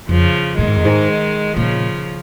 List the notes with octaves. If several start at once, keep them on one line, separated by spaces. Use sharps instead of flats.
F2 C#3 F3
A#2 D#3 G#3
G#2
F2
G#2
A#2 C#3 F3